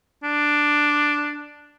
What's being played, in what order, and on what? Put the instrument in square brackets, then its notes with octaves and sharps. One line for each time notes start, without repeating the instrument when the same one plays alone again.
[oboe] D4